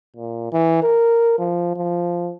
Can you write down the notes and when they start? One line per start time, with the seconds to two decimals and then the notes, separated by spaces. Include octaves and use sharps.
0.16 A#2
0.52 E3
0.82 A#4
1.38 F3
1.76 F3